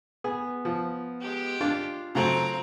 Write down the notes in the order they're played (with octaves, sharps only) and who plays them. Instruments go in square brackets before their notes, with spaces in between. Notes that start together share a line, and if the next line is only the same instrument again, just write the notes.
[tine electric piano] B3 [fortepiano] G#4
[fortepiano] F3
[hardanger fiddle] G#3 G4
[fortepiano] D4 [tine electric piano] F4
[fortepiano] C#3 F#3 A3 [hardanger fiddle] C4 A#5